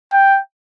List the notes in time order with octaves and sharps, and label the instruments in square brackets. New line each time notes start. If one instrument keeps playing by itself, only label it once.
[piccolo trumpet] G5